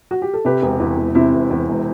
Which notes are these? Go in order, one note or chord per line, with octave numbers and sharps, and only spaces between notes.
F#4
G4
A4
C3 G4 B4
E1
E2
E1
C3 C4 E4
E1
E2
E1